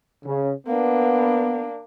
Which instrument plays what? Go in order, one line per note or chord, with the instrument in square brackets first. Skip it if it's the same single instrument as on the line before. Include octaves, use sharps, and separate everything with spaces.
[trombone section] C#3
[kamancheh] A#3 D4 [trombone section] B3